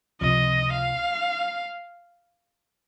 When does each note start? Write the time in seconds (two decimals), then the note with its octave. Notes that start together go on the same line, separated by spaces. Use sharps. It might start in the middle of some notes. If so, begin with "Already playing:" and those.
0.21 C#2 C3 F3 D#5
0.73 F5